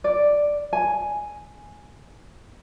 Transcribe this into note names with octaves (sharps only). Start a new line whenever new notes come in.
D5
G#5